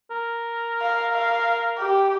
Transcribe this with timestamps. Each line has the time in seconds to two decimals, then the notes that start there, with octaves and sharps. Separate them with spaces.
0.11 A#4
0.81 F5
1.13 F5
1.78 G4